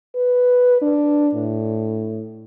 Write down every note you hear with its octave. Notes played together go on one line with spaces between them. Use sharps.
B4
D4
A2